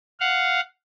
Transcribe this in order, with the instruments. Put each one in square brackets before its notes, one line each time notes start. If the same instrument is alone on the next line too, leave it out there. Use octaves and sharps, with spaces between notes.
[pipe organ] F5 F#5